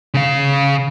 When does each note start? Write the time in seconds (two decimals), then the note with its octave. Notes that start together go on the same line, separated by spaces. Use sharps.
0.14 C#3 F5